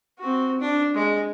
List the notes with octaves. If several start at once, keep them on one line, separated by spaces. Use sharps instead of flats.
C4 F#4
D4
G#3